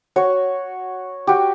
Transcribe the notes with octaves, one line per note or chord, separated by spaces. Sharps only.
F#4 C#5
F#4 G4